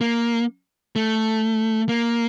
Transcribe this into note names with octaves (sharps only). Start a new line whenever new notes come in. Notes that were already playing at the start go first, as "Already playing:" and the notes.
A#3
A3
A#3